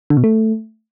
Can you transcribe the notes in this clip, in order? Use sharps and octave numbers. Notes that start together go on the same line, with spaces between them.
D3
B2
A3